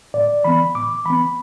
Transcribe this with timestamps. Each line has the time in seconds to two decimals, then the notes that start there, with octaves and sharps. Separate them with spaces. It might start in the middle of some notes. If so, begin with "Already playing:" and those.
0.14 A2 D5
0.44 E3 B3 B5
0.75 A2 D6
1.06 E3 B3 B5